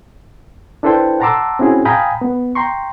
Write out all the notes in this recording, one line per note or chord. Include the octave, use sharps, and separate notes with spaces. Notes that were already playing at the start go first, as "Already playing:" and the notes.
D4 E4 A4 B4 C5 G5
F#5 A5 A#5 C6 D6 E6
C4 C#4 E4 F#4 G#4
F5 G5 G#5 A#5 B5 D#6
B3
G5 A#5 C6 C#6